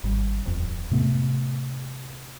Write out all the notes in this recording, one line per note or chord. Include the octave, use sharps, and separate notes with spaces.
G#1 G3
D#1 F2
A2 C3 A3 B3